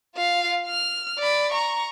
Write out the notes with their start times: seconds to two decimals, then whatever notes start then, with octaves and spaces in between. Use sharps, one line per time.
0.15 F4 F5
0.67 F6
1.19 D5 B5
1.52 A#5 C#6